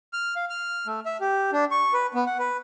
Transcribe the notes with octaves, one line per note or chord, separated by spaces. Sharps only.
F6
F5
F6
A3
E5
G4
D4
C#6
B4
B3
F#5
B4